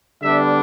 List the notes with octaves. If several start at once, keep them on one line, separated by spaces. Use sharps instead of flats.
D3 G3 B3 D4 E5